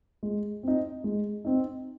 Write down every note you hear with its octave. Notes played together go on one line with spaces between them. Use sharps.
G#3
C4 D#4
G#3
C4 D#4